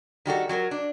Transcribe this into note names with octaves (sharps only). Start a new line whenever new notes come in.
D#3 G3 F#4 A4
F#3 F#4 G#4 A#4
D4